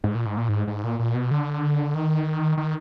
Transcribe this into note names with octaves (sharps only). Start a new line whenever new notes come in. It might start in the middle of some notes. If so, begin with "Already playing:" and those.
G#2
A#2
G#2
A#2
G#2
G#2
A#2
A#2
B2
D3
D#3
D#3